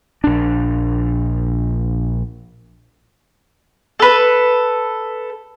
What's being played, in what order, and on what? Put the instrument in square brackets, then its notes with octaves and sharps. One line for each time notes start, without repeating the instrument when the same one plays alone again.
[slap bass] A#1 D4
[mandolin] A4 B4